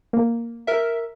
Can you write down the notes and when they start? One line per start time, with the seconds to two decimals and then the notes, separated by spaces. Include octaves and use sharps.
0.13 A#3
0.67 A#4 E5